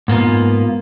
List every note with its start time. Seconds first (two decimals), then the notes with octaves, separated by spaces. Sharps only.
0.08 G#2 A#3 B3 F4